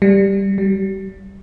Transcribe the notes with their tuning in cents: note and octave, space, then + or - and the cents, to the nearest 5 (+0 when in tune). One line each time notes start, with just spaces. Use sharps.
G3 +5
G3 -40